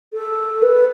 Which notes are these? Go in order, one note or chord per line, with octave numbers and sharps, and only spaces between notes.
A4
B4